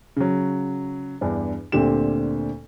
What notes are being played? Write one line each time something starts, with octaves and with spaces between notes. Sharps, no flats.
C#3 F#3
E2 G2 D4
D2 A#2 D3 C4 G4 E7